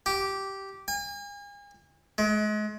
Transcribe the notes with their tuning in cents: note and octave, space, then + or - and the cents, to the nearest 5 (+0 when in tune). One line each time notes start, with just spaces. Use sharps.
G4 -10
G#5 -40
G#3 +35